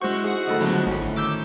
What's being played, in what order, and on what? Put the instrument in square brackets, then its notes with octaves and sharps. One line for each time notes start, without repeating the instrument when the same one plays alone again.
[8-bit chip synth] G#3 C#6 [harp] C#4 E4 C5 [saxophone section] F#4
[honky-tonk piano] D#4 [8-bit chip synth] G#4 F#5
[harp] D2 A4 D#5 [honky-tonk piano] D#3 B5
[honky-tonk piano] B2 F3 [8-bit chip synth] D3 F#3 G#3
[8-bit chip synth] G#1 [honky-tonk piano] A2 C#4
[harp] D#3 [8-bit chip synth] D6 E6 G6